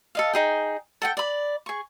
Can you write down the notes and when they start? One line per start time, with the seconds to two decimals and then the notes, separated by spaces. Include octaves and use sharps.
0.15 A4 D#5 F5
0.33 D#4 G#4 G5
1.02 A4 F#5 G5
1.17 D5 B5
1.66 G#4 C#6